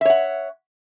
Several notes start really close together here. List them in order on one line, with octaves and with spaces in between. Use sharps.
E5 C#5 F#5